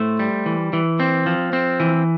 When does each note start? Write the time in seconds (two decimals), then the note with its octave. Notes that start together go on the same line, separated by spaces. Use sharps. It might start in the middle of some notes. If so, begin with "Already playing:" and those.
Already playing: A2 A3 C5
0.19 G3
0.46 E3
0.73 E3
1.00 C4
1.26 F3
1.53 C4
1.80 E3